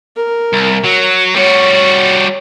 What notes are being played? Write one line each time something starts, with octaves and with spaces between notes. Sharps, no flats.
A#4
C2
F#3
G3 F#4 C#5